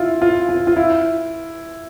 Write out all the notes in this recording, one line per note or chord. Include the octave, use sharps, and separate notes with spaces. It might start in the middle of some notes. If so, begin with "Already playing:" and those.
Already playing: E4 F4
F4
F4
F4
E4